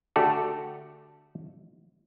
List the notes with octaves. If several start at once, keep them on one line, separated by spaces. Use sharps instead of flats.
D3 A3 F#4 G4 A4 D5